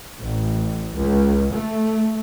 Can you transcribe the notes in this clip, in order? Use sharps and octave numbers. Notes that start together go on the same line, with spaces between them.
A1
C#2
A3